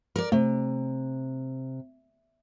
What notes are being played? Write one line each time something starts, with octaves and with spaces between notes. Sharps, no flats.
A#4 D5
C3 A3